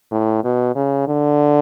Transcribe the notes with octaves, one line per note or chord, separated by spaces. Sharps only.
A2
B2
C#3
D3